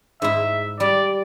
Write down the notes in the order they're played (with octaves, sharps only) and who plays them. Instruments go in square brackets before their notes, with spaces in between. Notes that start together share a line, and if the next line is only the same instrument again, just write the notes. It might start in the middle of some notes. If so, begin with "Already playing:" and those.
[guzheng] G#2 E4 [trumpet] E5
[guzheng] G3 [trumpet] D5